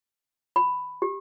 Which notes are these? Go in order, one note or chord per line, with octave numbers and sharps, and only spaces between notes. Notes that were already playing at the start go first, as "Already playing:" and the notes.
B5
G4